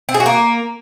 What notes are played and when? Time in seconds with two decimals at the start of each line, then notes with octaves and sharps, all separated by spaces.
0.09 C4
0.14 G#4
0.20 F#4
0.26 A#3